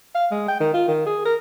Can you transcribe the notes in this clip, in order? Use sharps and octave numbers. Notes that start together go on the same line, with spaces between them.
F5
G#3
G5
D#3
F4
D#3
G#4
A#4